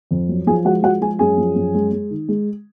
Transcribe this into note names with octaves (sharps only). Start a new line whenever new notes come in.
F2
F#3
F3 G#4 G#5
G#3 F#4 F#5
F3 F#4 F#5
G#3 G#4 G#5
F#2 G#4 G#5
F3
F#2
G#3
G#3
D#3
G#3